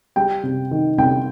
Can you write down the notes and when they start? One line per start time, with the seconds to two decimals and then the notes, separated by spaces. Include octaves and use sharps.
0.16 G3 G5
0.43 C3
0.71 D#3
0.98 C2 G5